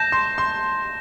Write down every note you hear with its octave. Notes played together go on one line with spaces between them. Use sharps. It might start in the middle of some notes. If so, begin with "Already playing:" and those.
Already playing: A5 G6 A#6 E7
C6
C6